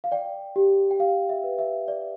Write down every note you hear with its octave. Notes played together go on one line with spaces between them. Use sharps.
F5
D5 G5
G4
G5
G4 F5
E5
B4
E5
D5